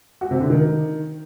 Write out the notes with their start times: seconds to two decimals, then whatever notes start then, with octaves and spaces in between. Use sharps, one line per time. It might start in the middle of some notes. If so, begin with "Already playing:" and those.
0.21 F#4
0.31 C3
0.40 D3
0.50 D#3